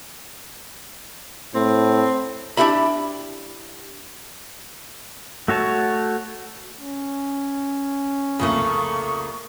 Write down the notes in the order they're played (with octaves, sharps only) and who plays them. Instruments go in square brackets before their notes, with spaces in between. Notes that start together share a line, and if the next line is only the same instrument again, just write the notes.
[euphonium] A2 [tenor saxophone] C4
[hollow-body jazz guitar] D4 E4 G4 E5 B5
[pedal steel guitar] A3 F#4 C#5 A5
[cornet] C#4
[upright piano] C2 F2 [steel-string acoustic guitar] C#3 A3 A#3 [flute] C#6